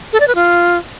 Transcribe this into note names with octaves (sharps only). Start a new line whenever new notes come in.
A4
D5
B4
F4